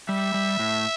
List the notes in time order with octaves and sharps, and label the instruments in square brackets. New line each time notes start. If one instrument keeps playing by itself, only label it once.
[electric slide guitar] G3 [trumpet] E5
[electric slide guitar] G3
A2